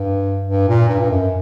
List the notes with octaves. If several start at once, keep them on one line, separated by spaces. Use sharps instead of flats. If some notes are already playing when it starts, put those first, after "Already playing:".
Already playing: G2
G2
A#2
G2
G2
F#2